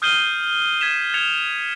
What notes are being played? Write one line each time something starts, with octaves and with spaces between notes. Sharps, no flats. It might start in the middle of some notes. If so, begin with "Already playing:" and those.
D#6 F6 G6 C7 D#7 G7
G#6 B6 E7
G6 G#6 C#7 F7